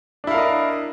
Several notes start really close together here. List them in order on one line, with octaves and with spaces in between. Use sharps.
D4 E4 F5 A#4 D#5